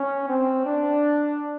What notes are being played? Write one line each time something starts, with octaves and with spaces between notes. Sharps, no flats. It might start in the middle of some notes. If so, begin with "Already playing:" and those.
Already playing: C#4
C4
D4